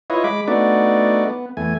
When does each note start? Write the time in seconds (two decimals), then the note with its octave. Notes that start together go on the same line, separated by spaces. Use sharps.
0.10 E4 F4 B4 C#5 D#5
0.24 G#3 B5 D6
0.48 A3 B3 D4 D#4 F#4 D5
1.25 B3
1.57 E2 A3 G#5